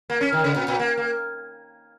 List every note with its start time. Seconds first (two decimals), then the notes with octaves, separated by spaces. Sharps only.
0.10 A#3
0.21 C#4
0.32 D#3
0.44 C#3
0.56 A#2
0.68 A#2
0.80 A#3
0.97 A#3